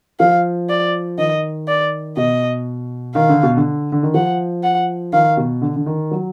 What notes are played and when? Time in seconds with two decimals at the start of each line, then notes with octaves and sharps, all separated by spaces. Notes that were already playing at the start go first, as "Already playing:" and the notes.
0.20 F3 F5
0.69 D5
1.18 D#3 D#5
1.68 D5
2.17 B2 D#5
3.15 D#3 F5
3.29 D3
3.43 B2
3.57 D3
3.92 D3
4.03 D#3
4.14 F3 F#5
4.63 F#5
5.13 D#3 F5
5.37 B2
5.62 D3
5.76 D3
5.86 D#3
6.11 F#3